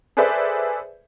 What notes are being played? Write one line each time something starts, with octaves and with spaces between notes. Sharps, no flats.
G#4 A4 B4 C5 D5 E5